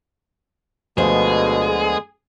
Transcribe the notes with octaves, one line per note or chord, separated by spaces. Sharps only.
D2 B2 D3 F3 G#3 B3 G#4 C5